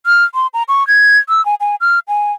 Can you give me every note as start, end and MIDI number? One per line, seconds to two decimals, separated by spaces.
0.06 0.24 89
0.34 0.47 84
0.54 0.63 82
0.68 0.86 85
0.87 1.18 92
1.29 1.44 88
1.45 1.55 80
1.60 1.75 80
1.81 1.99 89
2.08 2.32 80